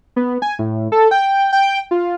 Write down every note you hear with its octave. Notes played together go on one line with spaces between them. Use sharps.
B3
G#5
A2
A4
G5
G5
F4